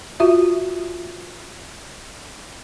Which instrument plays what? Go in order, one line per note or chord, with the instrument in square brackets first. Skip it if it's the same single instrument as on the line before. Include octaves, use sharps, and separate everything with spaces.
[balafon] F4 F#4 E5